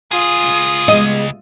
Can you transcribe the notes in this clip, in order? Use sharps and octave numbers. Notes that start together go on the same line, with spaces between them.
C#2 F4 G#4 D#6
G3 G#3 B3 D#5